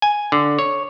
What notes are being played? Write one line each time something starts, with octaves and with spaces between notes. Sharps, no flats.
G#5
D3
C#5